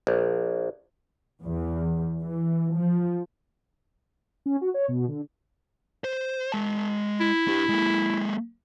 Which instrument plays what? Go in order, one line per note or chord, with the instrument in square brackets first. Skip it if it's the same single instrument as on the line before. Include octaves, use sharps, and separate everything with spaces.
[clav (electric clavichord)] A#1
[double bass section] E2
E3
F3
[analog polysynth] C#4
F#4
C#5
B2
D3
[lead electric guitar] C5
G#3 A5
[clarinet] E4
[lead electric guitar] D4 G4
G#3 A#3